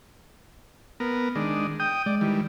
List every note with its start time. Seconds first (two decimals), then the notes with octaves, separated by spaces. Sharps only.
1.00 B3 A#4
1.36 D#3 G#3 D4
1.80 G5 D#6 G6
2.06 G#3 D5
2.21 D#3 E3 G3